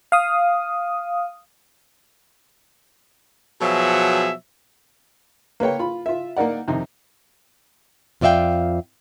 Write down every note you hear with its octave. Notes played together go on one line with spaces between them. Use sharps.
F5 D#6
B2 F3 F#3 G#4 E5
A#3 B4 C#5 G5
F4 B5
F4 E5
A#3 D#4 A#4 D5 F#5
F2 C3 D#3 D#4
F2 F4 D5 E5 F5 G5